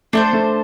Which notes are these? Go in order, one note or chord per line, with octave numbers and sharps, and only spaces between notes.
A3 D4 A4 C5
A3